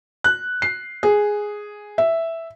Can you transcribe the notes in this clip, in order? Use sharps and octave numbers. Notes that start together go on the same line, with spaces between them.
F#6
C7
G#4
E5